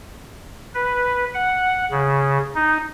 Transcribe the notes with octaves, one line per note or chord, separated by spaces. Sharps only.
B4
F#5
C#3
D#4